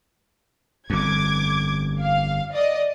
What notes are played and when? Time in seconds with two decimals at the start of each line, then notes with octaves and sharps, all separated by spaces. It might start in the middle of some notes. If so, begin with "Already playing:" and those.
0.90 G1 F2 D6 G#6
2.01 F5
2.53 D5 D#5